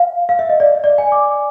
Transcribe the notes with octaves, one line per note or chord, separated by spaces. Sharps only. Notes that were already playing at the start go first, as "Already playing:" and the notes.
Already playing: F5
F5
E5
D#5
D5
D5
G#5
D6